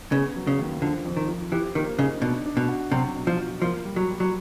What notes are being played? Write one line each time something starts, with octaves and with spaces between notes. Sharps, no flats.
C#3 B3
F#3
C#3
D#2
D3 F3
F2
D#3
F3
E3 G4
D#3 A#3
C#3 D#4
B2 D4
D4
B2
F#4
C3 F#3
B2
F3
F#3
F3 A#3
G3
F#3
G3
F#3